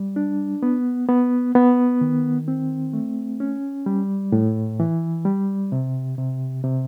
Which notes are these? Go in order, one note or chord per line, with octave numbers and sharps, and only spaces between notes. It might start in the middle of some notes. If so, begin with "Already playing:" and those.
Already playing: G3
D4
B3
B3
B3
D#3
C4
A3
C#4
G3
A2
E3
G3
C3
C3
C3